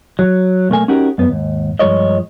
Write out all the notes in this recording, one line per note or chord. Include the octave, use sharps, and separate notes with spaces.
F#3
B1 A3 A#3 G#5
C#4 D#4 F#4 G4 A#4
F#2 B3
D#2 G#2
G2 F3 G#3 C#5 D#5